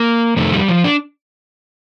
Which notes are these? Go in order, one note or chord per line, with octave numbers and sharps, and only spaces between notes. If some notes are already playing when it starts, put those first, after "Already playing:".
Already playing: A#3
F2 C3 D#3 A3
G3
F3
D4